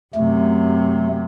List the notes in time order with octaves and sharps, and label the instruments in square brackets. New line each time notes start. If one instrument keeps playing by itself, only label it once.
[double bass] F#2 C3 [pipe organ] A3